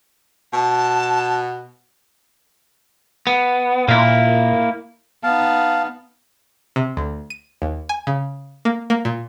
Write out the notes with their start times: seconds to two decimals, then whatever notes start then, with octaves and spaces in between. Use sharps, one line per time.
0.53 B2 A5
3.27 B3
3.88 A#2 A#3 E4
5.23 B3 D#4 F5 A5
6.76 C3
6.97 D2
7.30 D#7
7.62 D#2
7.89 G#5
8.07 C#3
8.65 A#3
8.90 A#3
9.05 A#2